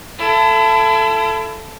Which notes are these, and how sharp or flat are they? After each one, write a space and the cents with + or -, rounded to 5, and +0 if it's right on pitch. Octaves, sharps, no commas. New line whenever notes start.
E4 +35 A4 +0